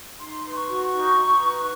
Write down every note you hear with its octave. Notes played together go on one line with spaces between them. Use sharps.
D#4 C6
B4
C#6
F#4
D#4 C#6
D#4
B4